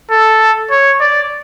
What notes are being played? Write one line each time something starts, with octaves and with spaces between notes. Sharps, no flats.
A4
C#5
D5